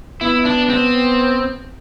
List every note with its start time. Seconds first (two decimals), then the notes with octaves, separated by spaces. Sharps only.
0.21 B3 E4
0.45 D4
0.69 C4